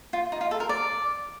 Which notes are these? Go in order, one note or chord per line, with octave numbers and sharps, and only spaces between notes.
F4
D#4
F4
A4
A#4
D5